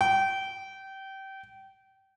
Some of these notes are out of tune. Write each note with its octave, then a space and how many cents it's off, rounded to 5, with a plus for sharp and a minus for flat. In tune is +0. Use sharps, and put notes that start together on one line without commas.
G5 -25